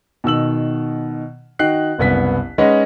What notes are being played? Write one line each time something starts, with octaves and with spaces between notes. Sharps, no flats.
B2 D#3 E6 F#7
D#3 D#4 F#4 G5 F#6 C7
F#1 C2 B3 B6
G#3 C#4 D#4 B4 D#5 F#5